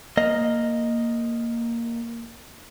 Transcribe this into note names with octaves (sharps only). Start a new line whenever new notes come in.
A#3 D#5